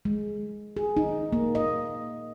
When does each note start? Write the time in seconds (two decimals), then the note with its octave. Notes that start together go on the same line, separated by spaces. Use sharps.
0.05 G#3
0.77 G#4
0.97 D#4
1.33 A#3
1.55 D#5